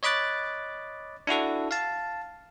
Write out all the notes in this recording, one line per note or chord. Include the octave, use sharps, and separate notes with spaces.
C#5 D#5 B5 D6 F#6 A6
D4 E4 F#4 A4
F5 A5